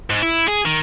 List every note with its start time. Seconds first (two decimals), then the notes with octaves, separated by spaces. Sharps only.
0.10 G#2
0.23 E4
0.48 G#4
0.66 D#3